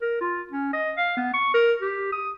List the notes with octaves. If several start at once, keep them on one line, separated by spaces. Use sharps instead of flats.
A#4
F4
C#4
D#5
F5
B3
C#6
A#4
G4
D#6